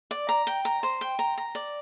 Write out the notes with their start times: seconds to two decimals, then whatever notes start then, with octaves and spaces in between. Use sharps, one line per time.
0.11 D5
0.29 A#5
0.47 G5
0.65 A#5
0.83 C5
1.01 G5
1.19 A#5
1.38 A#5
1.55 D5